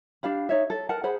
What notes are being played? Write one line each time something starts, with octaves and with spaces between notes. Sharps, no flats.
D4 G4 F5 B5
D#4 C#5 E5
A4
A#4 B4 F#5 A5
G#4 C5 F#5 B5